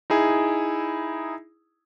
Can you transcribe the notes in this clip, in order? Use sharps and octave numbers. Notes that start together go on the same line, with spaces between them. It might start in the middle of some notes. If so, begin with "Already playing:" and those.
D#4 E4 G#4